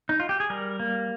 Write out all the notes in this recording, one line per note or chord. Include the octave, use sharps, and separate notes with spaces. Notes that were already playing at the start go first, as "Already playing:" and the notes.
D#4
F4
G4
G#4
G3 A#4
A#3